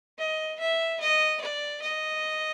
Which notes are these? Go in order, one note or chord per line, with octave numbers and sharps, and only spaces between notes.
D#5
E5
D#5
D5
D#5